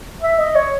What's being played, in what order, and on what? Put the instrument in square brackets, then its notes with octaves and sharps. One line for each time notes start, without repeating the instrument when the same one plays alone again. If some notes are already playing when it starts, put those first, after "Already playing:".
[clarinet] E5
D#5
C#5